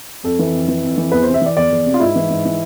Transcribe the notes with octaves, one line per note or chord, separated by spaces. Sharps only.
F2 A4
E3
F2
E3
F2
E3
E2 B4
C3 C5
E5
E3 D5
E2 D5
E2
C3
F4
G#2 E4
E3
G#2
E3